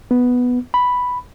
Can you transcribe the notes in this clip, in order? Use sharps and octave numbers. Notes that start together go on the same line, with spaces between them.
B3
B5